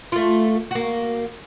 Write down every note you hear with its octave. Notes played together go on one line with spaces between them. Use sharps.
A3 F4
A#3 F#4